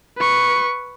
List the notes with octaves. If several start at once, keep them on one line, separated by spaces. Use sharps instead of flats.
B4 C#6